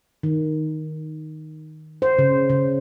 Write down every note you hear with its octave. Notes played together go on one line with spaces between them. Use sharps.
D#3
C5
C#3
C#3